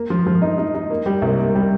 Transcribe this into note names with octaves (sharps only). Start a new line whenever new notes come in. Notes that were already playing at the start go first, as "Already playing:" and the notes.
Already playing: A#3
F3
F3
D#4
D#4
D#4
A#3
G3
C2
A#3
G3